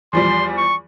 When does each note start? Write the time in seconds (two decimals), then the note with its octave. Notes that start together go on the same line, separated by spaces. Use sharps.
0.13 E2 F3 G3 C6
0.57 C#6